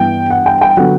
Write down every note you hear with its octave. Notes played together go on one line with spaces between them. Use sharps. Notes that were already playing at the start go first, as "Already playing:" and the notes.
Already playing: G2 E3 B3 G5
F#5
G5
G5
D3 F#3 B3 F#5